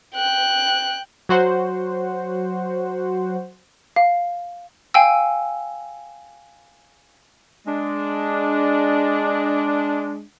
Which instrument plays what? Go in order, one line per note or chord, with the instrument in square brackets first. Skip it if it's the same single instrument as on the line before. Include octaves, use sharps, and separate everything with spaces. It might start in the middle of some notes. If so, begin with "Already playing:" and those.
[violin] G5 F#6
[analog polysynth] F#3 F#4 C5 F#5
[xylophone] F5
F5 G5 G#5 E6
[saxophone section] G#3 D4